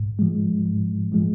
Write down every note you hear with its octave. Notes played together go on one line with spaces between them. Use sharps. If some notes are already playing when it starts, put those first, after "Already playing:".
Already playing: G#2
F3 G#3
G#2
F3 G#3